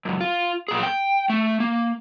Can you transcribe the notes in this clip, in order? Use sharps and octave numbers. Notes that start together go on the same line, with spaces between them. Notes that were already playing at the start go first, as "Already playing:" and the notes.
C#2 F#2
F4
A#2 G#4
G5
A3
A#3